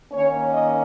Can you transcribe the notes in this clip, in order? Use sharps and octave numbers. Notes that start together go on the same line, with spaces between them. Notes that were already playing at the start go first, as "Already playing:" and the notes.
D#3 A#3 C#4 C#5
D#5